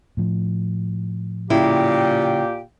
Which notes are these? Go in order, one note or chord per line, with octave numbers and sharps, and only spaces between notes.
A2 F3
A#2 C#3 A#3 E4 G4 G5